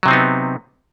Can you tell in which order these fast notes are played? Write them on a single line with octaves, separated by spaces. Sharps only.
F#3 C3 C4 D#4 B3